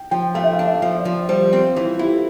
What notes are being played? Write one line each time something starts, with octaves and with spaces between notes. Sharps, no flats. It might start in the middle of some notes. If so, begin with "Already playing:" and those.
Already playing: G5
F3 G5
A3 F5
E5
F5
D4
E5
F3
D5
F3
G3 C5
C4
E3
F4
E4 G4
A4